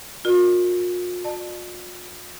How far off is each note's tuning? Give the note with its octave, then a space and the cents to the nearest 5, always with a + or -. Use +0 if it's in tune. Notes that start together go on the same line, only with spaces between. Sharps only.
F4 +45 A#4 +0 D5 +40
D5 +40 A5 +0